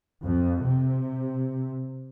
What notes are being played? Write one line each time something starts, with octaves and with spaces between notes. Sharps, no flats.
F2
C3